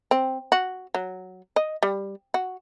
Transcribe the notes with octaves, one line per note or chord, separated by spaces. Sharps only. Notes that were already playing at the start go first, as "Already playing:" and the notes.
C4
F#4
F#3
D#5
G3
F#4